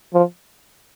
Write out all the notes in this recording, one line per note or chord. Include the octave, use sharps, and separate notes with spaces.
F3